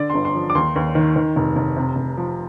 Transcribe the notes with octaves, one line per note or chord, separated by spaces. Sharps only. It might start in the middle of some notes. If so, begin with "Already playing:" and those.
Already playing: D3 D5
G1 C6
C6
F3
D6
D#2 C6
D#2
D#3
D#3
F1
F1
C3
F1
F3